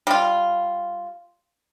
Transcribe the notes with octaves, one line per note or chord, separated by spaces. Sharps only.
G3 F4